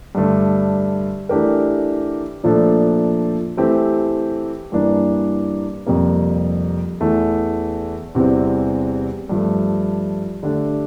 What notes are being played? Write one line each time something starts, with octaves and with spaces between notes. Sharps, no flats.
G2 D3 A3 D4
E3 A3 D4 G4 A#4
A#2 F3 A3 D4 A4
E3 A3 C4 G4
G2 E3 A#3 D4
F2 C3 G3 A#3
E2 E3 A3
E2 C3 E3 G3 C4
G2 F3 A3
D3 A3 D4 G4